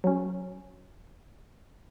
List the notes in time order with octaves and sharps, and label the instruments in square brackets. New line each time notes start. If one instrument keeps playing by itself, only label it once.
[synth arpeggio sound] F#3 C#4